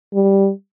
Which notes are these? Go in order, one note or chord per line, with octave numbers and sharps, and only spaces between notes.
G3